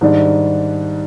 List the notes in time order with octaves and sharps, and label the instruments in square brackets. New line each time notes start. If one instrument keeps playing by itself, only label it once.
[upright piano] G#2 D#3 G3 D4